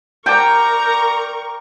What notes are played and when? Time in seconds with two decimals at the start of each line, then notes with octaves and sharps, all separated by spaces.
0.26 A#4 D5 G5 A#5 C#6